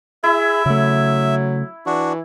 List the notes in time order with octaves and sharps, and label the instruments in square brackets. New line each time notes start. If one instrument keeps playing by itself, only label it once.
[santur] E4 [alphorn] G#4 [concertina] E5
[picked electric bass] C#3 A3 [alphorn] F#3
[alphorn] E3 [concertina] D4 F#4